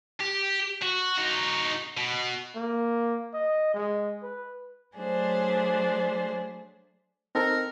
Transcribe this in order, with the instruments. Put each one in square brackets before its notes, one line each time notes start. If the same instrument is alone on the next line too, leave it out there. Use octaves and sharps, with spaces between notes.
[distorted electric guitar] G4
F#4
D#4 F#4
B2
[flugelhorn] A#3
D#5
G#3
B4
[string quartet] F#3 A3 D4 G#4 C5
[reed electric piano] C4 D#4 A4 [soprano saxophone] A#4